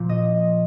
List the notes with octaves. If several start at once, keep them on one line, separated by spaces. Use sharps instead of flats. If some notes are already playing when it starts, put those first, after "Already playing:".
Already playing: A#2 F3
D#5